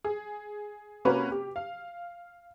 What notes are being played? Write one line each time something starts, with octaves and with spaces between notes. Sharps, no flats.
G#4
C3 A#3 C#4 F#4 B4
G4
F5